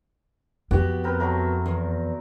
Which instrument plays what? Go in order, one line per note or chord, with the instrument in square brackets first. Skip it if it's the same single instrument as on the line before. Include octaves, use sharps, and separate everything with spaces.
[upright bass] F2 [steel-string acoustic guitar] B3 G4 [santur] F#4
[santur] C4 A#4 B4
F#3 A3 A#4
[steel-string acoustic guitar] E2